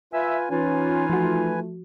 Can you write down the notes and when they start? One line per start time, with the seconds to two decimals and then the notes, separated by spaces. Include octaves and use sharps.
0.13 F4 B4 E5 G#5
0.50 E3 C#4 D#4 F4 B4 G#5
1.10 F3 A3 F#4